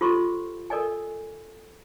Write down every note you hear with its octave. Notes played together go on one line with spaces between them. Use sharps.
F4 G4 A4 C5 C6 C#6
A4 A#4 D5 D#5 G#5